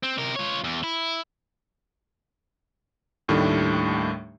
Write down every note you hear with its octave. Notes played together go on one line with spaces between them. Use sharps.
C4
C3 A#4
F4 C#5
E2
E4
D#2 A2 D#3 G3 A3 D4